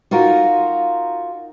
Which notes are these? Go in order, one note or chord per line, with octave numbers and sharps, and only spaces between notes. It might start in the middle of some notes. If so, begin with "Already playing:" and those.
D#4 F4 F#4 A#4